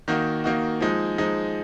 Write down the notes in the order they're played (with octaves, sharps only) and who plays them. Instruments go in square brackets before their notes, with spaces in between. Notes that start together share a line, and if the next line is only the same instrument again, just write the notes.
[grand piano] D#3 A#3 D#4 F#4
D#3 A#3 D#4 F#4
F3 G#3 D#4
F3 G#3 D#4